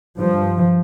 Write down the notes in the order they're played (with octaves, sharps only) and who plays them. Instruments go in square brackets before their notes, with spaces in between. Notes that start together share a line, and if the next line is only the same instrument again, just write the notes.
[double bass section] G2 F3